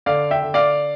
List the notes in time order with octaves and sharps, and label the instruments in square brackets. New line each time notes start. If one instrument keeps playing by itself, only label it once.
[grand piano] D3 D5 F5
E5 G5
D3
D5 F5